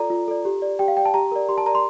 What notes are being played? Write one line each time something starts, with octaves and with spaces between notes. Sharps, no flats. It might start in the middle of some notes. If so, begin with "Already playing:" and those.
Already playing: F4 A4 D5 A#5
F4
A4 D5
G4
D5
G4 G5
F5
D5 G5
A5
G4 A#5
A#4 D5
G4 C6
A5
A#4 D5 A#5
C6